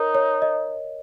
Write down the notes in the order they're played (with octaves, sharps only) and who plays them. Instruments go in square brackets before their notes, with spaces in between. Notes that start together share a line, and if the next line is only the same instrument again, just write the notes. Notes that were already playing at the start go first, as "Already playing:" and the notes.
Already playing: [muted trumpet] D#4 [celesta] A#4 C#5
[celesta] C#5
D#5